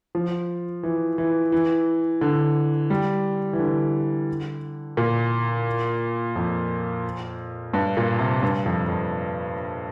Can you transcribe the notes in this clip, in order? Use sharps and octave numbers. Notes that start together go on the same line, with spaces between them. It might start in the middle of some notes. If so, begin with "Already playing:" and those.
F3
E3
E3
E3
D3
G3
E3
D3
A#2
F2
G2
A#2
C3
G2
F2
F2